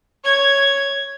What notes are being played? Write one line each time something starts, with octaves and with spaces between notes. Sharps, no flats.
C#5 G#6